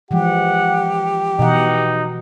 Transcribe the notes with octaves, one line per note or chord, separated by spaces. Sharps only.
E3 F3 G#3 G4 F#5
B2 E3 D#4 F#5